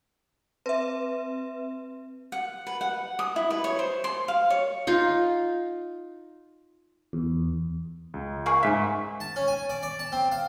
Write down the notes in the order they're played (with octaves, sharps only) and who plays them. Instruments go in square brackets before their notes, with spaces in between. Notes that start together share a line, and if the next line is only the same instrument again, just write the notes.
[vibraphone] C4 [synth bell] B4 E5
[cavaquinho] F#5
B4
F#5
D#6
E4
B4
C#5
C5
C6
F5
C#5
[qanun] D#4 F4
[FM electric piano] E2
[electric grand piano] C#2
[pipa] A#3 G#4 C#6
[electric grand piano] G#2 B6 [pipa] E5 G#5
[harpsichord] A5
C#4
G#5
D5
D5
A5
C4
F5